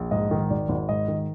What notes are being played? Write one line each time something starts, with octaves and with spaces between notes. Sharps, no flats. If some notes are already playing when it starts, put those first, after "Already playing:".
Already playing: A#1
G#2 D#5
D#3
G#1 D5
G#1
G#2 D#5
D#3